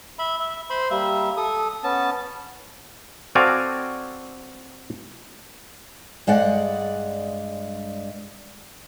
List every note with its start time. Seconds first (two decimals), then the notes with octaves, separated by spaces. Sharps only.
0.19 E5 B5
0.40 E5
0.70 C5 B5 C6
0.90 G3 A#3 E5
1.37 A4 D#6
1.83 B3 C#4 A5
3.35 C4 F#4 A4 D5 F5 G#5
6.27 G2 G#3 D5 F#5